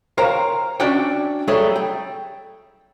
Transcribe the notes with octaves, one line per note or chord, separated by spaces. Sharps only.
A#4 C5 C#5 F5 G5 A#5
C#4 D4 F#4 D5 E5 G5
F#3 G3 A3 G#4 C#5 E5
G5